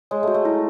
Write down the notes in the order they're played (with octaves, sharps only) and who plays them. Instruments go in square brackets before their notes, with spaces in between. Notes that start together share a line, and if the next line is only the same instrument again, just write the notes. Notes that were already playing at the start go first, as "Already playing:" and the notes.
[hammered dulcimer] G#3 [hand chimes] C#5
[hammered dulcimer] A3 [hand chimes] F#4
[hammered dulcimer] A3
[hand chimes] E4